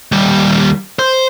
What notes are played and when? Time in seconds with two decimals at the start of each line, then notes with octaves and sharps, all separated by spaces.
0.12 D#2 G3
0.99 C5